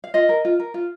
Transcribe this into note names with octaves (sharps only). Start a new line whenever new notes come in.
F5
F4 D#5
A#4
F4
A#4
F4